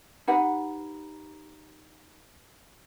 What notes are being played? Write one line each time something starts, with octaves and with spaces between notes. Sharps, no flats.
D#4 G4 B4 F#5